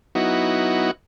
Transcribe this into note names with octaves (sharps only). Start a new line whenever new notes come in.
F#3 B3 D#4 E4 F#4